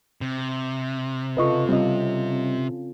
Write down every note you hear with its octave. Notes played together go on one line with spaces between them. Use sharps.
C3
C#3 F4 A4 B4 D#5 C#6
G3 C4 C#4 F4 D#5